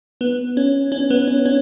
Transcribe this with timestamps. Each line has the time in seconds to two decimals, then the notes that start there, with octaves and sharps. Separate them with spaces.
0.21 B3
0.57 C#4
0.92 C#4
1.10 B3
1.28 C#4
1.45 C#4